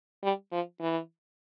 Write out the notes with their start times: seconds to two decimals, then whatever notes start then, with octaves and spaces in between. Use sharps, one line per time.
0.23 G3
0.52 F3
0.80 E3